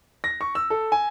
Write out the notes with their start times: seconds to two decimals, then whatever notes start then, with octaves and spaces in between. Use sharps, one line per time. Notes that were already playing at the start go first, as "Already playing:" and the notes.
0.24 A#6
0.41 C#6
0.55 E6
0.70 A4
0.92 G#5